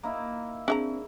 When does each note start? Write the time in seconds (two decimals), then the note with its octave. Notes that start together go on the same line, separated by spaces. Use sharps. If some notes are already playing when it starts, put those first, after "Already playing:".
0.03 A#3 D#4 E4
0.68 C4 D4 G#4 E5 A#5